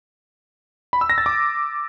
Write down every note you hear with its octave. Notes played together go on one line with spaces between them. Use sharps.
B5
E6
A#6
A6
D6